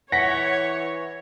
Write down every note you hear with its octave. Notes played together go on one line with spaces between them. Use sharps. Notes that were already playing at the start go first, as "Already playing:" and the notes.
E3 C#5 F#5 A#6 B6